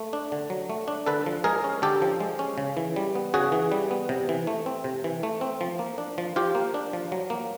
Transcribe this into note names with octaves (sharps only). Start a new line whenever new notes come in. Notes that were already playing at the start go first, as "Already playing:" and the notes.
Already playing: A3
D4
D3
F#3
A3
D4
D3 A4 B4
F3
G#3 G#4 A#4
C#4
D3 G4 A4
F3
G#3
C#4
C#3
E3
G3
B3
C#3 F#4 G#4
E3
G3
B3
C3
E3
A3
C4
C3
E3
A3
C4
F3
A#3
D4
F3
F3 F4 G4
A#3
D4
F3
F#3
A#3